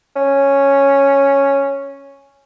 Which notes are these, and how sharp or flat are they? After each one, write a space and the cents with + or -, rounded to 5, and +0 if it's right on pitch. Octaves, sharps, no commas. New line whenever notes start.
C#4 -5